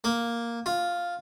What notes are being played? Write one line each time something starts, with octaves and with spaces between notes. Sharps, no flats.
A#3
F4